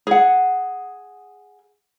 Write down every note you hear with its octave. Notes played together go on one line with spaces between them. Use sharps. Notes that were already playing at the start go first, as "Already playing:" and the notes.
G#4 F#5